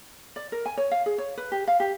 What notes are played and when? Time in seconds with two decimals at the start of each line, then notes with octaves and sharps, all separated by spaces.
0.36 D5
0.52 A#4
0.66 G#5
0.77 C#5
0.91 F5
1.06 G#4
1.18 C#5
1.37 B4
1.52 G4
1.68 F5
1.80 G4